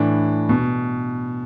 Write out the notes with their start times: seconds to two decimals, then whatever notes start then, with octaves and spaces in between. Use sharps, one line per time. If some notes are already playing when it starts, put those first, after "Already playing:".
Already playing: A2 E3 D4
0.49 B2